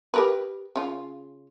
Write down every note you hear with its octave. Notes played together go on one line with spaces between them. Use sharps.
G4 A#4 B4
C#3 F4